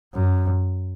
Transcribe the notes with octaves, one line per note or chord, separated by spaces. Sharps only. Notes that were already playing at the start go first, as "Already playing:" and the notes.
F#2